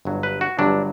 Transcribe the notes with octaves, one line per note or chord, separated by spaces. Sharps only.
G1 G2 F#3
B4
F#4
G1 G2 F#3 D4